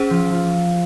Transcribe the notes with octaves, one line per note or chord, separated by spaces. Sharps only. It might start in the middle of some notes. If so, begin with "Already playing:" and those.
Already playing: C#4 G#4 C5
F3 F4
F3 F4